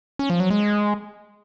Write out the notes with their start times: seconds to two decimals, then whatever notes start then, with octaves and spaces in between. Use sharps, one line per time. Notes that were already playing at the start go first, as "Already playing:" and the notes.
0.19 C#4
0.30 F3
0.40 F#3
0.50 G#3